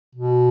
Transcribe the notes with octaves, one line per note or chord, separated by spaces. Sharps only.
B2